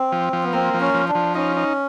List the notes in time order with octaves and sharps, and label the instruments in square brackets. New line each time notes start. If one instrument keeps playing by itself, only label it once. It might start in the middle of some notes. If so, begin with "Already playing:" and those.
Already playing: [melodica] C4
[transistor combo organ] F3
F3
[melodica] B3
[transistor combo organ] A#3 [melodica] C4
[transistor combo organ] F3
[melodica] C#4
[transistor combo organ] F3
[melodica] D4
[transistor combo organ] F3
[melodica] C#4 [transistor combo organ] D#4
[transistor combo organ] D#4